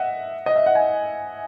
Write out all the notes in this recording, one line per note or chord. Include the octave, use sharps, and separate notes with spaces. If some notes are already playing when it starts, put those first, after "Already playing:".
Already playing: D#5 E5 F#5
D#5
E5
F#5
G#5